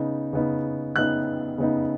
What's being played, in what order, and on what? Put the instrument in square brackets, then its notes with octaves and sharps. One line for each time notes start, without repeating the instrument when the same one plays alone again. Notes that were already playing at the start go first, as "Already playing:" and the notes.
Already playing: [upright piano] C#3 B3 D#4
C#3 B3 D#4
C#3 B3 D#4 F#6
C#3 B3 D#4